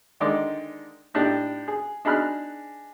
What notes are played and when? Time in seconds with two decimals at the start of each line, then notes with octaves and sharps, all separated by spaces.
0.20 D3 D#3 G#3 D#4 D5
1.14 A2 D4 D#4 G4
1.68 G#4
2.05 D4 D#4 G#4 B5 F6 F#6